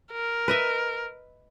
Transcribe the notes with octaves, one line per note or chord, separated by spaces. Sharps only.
A#4
B4 D#5 E5